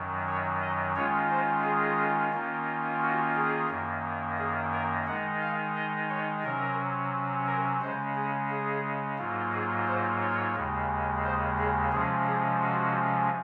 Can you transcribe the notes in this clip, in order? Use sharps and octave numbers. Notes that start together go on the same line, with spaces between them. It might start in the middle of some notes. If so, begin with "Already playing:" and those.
Already playing: F#2 D#3 F#3
C#5
D#5
D#3 G#3 C#4 F4 C#5
C5
G#4
D#3 A#3 C#4 F4
F#4
G#4
F#2 D#3 A#3
G#4
A#4
D#3 G#3 D#4 F#5
F5
D#5
C#5
C3 F#3 C#4 A#4
A#4
C#3 G#3 C#4 C5
G#4
G#4
G#2 F#3 A#3 F4
G#4
C5
C#5
D#2 C#3 G#3
C5
G#4
C3 F3 G#3 C#4 G#4
G#4
F#4